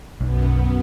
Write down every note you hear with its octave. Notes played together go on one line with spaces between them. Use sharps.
B1 F#2 B3